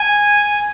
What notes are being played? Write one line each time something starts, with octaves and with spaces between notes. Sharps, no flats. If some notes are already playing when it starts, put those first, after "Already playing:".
Already playing: G#5